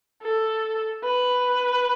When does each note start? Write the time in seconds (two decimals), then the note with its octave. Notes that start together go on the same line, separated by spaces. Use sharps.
0.22 A4
1.04 B4